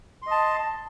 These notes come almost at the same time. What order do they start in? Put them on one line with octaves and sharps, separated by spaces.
C6 D#5 A5